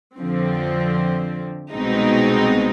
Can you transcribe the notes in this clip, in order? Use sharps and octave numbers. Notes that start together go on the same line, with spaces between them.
F2 D3 F3 C4
C2 B2 G#3 C4 D#4